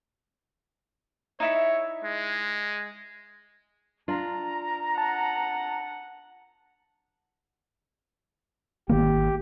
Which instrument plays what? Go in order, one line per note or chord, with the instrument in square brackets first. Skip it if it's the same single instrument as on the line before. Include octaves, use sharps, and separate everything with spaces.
[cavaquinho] D#4 E4 E5 [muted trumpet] C#5
[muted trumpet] G#3
[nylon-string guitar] D4 F4 [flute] A#5
[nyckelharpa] F#5 [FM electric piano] A5
[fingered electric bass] G#1 D#3 A#3 [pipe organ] G4